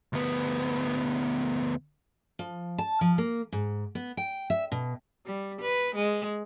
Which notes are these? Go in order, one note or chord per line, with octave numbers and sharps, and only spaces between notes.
D2 B3
F3
A5
F3
A#3
G#2
B3
G5
E5
B2
G3
B4
G#3